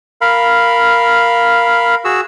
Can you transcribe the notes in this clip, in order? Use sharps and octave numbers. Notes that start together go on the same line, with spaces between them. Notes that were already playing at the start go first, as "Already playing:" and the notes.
A#4 F5 B5
F#4 G#4 E6